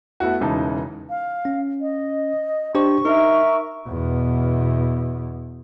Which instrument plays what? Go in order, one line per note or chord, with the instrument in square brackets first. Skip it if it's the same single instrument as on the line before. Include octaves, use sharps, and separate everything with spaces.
[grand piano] A3 B3 E4 F#4
E1 C#3 E3 D#4 A5
[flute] F5
[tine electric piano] C#4
[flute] D#5
[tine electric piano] D4 G4 C5 [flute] C#6
[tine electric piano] D#4 [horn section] A#4 E5
[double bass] E2 B2